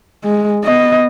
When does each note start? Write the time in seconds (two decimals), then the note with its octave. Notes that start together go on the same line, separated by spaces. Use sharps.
0.25 G#3
0.64 B3 D#5